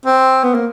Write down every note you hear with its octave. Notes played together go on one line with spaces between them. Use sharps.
C4
B3
A#3